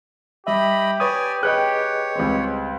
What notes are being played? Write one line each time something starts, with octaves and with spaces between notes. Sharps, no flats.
G3 G4 D#5 E5 B5
B4 C#5 D5 G#5 D#6
G#4 B4 C#5 D#5 G5 F#6
C#2 G3 C4